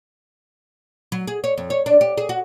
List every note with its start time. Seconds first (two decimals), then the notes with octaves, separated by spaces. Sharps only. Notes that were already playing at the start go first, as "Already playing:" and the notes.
1.12 F#3
1.27 G#4
1.44 C#5
1.58 F2
1.70 C#5
1.86 D4
2.01 G4
2.17 G#4
2.29 F#4